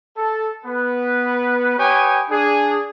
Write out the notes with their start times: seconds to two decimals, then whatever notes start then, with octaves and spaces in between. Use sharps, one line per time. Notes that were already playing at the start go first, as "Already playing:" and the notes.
0.17 A4
0.65 B3 B4
1.78 G4 B4 C#5 G5 G#5 D#6
2.30 D4 G#4